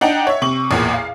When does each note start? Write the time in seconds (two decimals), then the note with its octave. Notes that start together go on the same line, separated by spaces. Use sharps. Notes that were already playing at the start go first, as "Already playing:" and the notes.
0.01 D4 D#4 F#5 G5
0.27 C#5 E5
0.42 C3 C#6 F#7
0.71 A1 E2 A#2
0.93 F5